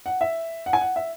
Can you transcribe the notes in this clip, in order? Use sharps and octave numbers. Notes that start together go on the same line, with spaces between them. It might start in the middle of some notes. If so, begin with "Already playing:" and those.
F#5
E5
F#5
G#5
F#5
E5